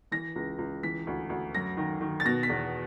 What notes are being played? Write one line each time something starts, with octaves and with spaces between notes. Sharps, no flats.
E3 A#6
C#2
C#2
E3 B6
D2
D2
F#2 A#6
D#3
D#3
A6
B2 A#6
B6
E2